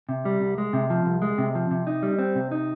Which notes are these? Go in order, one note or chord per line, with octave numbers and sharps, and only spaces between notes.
C3
G3
C2
G#3
C3
F3
C2
G#3
C3
F3
C3
D#4
G3
C4
C3
D#4